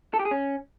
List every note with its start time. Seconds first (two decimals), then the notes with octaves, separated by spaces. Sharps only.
0.14 A4
0.19 G4
0.25 G#4
0.31 C#4